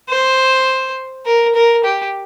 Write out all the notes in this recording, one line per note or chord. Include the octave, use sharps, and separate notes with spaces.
C5
A#4
A#4
G4